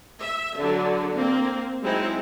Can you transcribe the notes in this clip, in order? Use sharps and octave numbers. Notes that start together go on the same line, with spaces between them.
E5
D3 F#3
A#3 C4
F#3 G#3 C4 D#4 E4